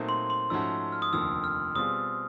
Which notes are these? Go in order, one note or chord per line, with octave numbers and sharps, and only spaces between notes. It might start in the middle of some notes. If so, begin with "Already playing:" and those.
Already playing: A#2 F#3 A3 C4 D#4
C6
C6
G#2 F3 A3 C#4 F#4 E6
F6
D#6
F1 D#2 D3 F3 E6
F6
B2 G3 C4 F4 G#4 D#6